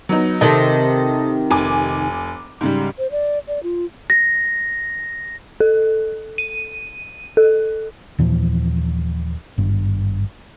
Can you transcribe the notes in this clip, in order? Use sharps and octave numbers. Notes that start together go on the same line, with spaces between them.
F#3 B3 D#4
C3 D#3 A4 D#5
F1 G#5 D6
G#2 C#3 G3
C5
D5
D5
F4
A#6
A4
D#7
A4
D#2 A#2 E3 F3
G#1 G2